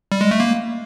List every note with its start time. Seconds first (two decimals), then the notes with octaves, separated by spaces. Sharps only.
0.12 G3
0.21 G#3
0.31 A3
0.40 A#3